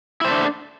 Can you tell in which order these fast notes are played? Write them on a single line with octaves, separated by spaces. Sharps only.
E4 C5 A3 D4